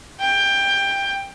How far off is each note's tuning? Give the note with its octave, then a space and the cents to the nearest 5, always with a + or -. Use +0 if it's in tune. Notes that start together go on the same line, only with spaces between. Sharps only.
G5 +15